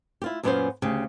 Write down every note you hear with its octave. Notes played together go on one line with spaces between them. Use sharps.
E4 F4 G4
F#2 A#2 A#3 B3 C#4 C5
D2 C#3 G4